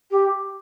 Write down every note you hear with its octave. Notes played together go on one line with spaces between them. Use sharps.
G4